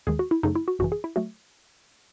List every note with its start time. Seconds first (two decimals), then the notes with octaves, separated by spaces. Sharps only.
0.07 D#2 D#3 G#3 G#4
0.19 F#4
0.31 E4
0.43 F#2 C#3 F#3 A3 D#4
0.55 E4
0.68 F#4
0.79 G#1 F#2 C#3 E3 F#4
0.92 G#4
1.04 E4
1.16 F#3 A3 F#4